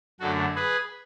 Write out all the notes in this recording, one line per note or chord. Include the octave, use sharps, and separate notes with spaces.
F#2 D3 A3 F#4 A4
G#4 B4